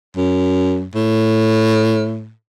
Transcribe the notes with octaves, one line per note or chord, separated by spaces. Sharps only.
F#2
A2